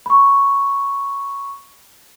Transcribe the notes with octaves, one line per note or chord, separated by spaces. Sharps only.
B5 C#6